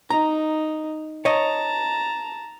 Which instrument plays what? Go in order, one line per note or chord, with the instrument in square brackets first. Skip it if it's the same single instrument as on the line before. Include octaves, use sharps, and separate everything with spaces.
[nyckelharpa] D#4 [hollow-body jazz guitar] A#5
[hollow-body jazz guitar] C#5 D#5 [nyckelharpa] A5 A#5